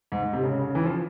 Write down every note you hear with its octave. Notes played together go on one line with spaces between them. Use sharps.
G#2
G#2
C3
C#3
C#3
E3
F3